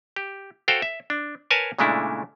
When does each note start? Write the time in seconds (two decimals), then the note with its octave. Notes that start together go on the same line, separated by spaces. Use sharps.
0.16 G4
0.68 F#4 A4 C5 F5 G5
0.82 E5
1.10 D4
1.51 A#4 B4 C#5 G#5 A5
1.78 A#2 C#3 G#3 A3 D4 E4